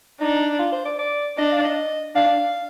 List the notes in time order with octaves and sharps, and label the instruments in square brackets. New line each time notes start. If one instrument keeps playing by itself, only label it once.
[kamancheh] D4 [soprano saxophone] D#4
[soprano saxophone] F4
C5
D5
D5
[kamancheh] D4 [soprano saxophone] D#5
[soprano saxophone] F5
D#5
[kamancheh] D4 [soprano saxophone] F5